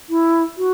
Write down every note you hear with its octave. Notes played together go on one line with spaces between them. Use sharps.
E4
F#4